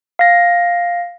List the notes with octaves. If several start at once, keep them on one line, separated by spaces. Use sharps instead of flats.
F5 A#6